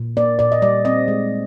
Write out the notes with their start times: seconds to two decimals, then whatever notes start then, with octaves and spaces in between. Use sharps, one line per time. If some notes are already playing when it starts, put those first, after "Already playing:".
Already playing: A#2
0.17 A#3 D5
0.39 A#2 D5
0.52 D#5
0.62 G3 D5
0.85 C4 D#5
1.08 G#3